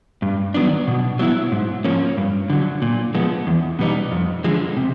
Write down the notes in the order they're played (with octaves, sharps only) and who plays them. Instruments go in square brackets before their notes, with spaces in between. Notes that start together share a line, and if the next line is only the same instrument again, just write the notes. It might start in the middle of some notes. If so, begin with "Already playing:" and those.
[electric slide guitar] G2
D#3 F#3 B3 D4
B2
F#3 B3 E4
G#2
F3 A#3 C#4
G2
D3 F#3
A#2
F3 G#3 B3
E2
B2 G3 B3 D#4
F2
D3 F3 G#3
C3